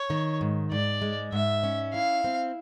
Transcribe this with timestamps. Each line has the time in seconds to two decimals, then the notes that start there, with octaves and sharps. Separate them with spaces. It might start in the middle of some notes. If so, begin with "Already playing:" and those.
Already playing: C#5
0.10 D#3
0.41 G#2
0.71 G#2 D5
1.02 G#3
1.32 G#2 E5
1.63 C#4
1.93 E4 F5
2.24 C4